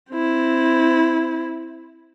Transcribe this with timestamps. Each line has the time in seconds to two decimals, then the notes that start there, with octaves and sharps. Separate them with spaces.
0.11 C4 E4